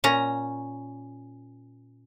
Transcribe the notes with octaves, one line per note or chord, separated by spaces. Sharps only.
A#2 C#4 A#5